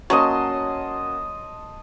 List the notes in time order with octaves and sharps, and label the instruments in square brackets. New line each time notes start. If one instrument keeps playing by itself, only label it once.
[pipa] F#3 [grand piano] A#3 C#4 F#4 [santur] D#5 A5 C6